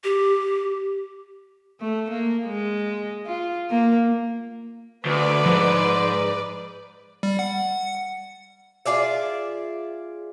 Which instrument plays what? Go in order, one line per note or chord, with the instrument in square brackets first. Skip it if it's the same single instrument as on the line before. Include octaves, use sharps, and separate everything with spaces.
[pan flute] G4
[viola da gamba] A3
A#3
G#3
F4
A#3
[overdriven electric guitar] D2 [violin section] B4 D5
[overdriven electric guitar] G#2 [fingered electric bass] F3
[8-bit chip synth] G3
F#5
[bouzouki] F4 G#4 D5 E5